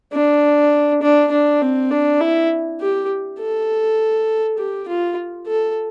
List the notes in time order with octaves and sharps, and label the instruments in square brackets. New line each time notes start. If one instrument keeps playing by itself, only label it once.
[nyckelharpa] D4
D4
D4
C4
D4
E4
G4
A4
G4
F4
A4